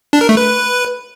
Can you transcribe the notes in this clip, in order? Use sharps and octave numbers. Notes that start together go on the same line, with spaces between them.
D4
A#4
A3
B4